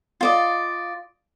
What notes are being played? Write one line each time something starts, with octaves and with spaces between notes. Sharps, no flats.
F4 D5 D#5